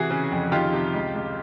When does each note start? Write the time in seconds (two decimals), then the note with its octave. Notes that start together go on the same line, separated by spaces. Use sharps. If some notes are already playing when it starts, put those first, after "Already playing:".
Already playing: C3 E3 F#4 G#4
0.10 C#3
0.32 F2
0.52 D#3 F4 G4
0.73 C3
0.94 C#2
1.14 C#2